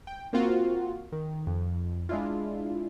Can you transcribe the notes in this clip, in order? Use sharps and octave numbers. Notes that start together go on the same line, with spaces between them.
G5
A#3 C4 F4 F#4
D#3
F2
G#3 D4 E4 F4